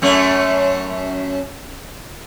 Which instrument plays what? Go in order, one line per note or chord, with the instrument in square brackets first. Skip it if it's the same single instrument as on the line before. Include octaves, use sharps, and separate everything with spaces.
[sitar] F#2 A3 C#4